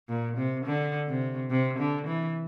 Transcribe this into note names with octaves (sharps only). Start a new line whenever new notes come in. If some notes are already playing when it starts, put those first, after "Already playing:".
A#2
C3
D3
C3
C3
D3
E3